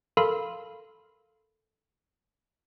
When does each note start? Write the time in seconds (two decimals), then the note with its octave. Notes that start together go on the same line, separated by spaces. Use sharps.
0.17 A4 A#4 F5 B5 C6